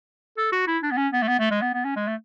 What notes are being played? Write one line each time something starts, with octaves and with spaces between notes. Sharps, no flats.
A4
F#4
E4
D4
B3
C#4
B3
A3
B3
A3
G#3
B3
B3
C#4
G#3
A3